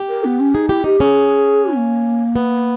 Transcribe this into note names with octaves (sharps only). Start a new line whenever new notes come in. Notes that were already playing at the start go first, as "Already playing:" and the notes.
Already playing: G4
A#4
B3
C#4
D#4 G#4
E4 G4
D#4 G4
C#4 G#4
A#3
B3